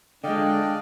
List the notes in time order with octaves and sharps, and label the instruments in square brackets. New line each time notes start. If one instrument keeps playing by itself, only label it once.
[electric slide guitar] D3 G#3 [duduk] D4 [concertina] D5 D#5 F5 [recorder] G5